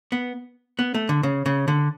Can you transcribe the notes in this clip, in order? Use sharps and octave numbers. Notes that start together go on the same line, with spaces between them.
B3
B3
A3
D3
C#3
C#3
D3